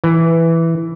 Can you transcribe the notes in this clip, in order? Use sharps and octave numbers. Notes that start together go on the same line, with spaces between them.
E3